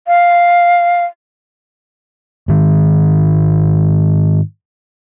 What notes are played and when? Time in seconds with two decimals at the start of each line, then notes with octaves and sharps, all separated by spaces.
0.07 F5
2.48 G#2 D#3